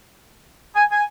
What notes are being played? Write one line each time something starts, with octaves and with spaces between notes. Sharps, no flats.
G#5
G#5